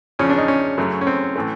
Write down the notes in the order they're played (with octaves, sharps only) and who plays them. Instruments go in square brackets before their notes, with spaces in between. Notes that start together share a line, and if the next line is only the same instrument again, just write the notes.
[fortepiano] E2 C#3 F3 C#4
D4
D#4
C#4
F#2 C#3 F#3 A3
C#4
C4
A2 E3 A3